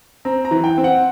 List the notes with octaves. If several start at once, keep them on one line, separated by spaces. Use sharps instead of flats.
C4 A#5
A#5
E3
G5
C4
F#5